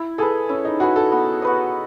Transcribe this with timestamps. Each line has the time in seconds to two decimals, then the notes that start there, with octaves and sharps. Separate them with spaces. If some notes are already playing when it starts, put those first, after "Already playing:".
Already playing: E4
0.18 G#4 A4 B4
0.49 C#4 E4
0.65 D#4
0.80 F#4 G#4 B4
0.96 A4
1.12 B3
1.42 F#4 B4 D#5